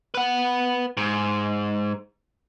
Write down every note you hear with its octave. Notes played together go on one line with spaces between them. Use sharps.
B4 F#5
G#2